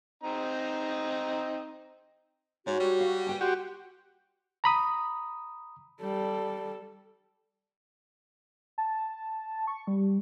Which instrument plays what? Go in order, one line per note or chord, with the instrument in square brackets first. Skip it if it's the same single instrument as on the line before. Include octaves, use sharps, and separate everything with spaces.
[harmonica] C4 D#4 A#5
[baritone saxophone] G#2 [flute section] F#4 [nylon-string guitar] C#5
[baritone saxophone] G3
[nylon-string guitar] F5
B4 G5 G#5
[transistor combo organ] F#4 G4 [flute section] C6
[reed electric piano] A#5 B5 D#6
[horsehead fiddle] G3 A4
[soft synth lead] A5
C#6
G3